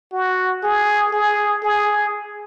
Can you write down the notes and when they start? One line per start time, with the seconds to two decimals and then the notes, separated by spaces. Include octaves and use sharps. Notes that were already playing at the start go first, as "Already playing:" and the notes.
0.13 F#4
0.63 G#4
1.13 G#4
1.63 G#4